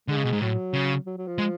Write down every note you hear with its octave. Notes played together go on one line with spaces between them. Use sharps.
D3 G#3
C#3
B2
G#2
A2 F#3
C#3
F#3
F#3
F3
G#3